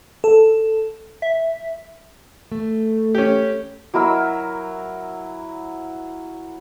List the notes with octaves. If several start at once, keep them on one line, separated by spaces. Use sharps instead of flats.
A4
E5
A3
C#4 G4
F#3 E4 A#4 E6